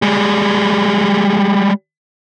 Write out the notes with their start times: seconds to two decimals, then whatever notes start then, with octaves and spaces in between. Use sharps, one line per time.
0.02 G3 G#3